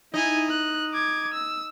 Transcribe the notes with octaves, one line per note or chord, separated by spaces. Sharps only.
D#4 E4 G#5
F#6
D6 G#6
E6